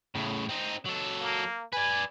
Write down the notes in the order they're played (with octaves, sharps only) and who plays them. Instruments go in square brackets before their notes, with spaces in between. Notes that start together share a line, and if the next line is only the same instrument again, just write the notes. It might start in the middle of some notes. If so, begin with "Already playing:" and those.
[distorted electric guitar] A2 C#3
C4 D#4
F#3 A4
[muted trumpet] A#3
[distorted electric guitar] B4 D5 [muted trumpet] G#5